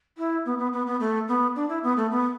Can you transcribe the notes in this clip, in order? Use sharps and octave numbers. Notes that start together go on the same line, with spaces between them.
E4
B3
B3
B3
B3
A3
B3
D4
E4
B3
A3
B3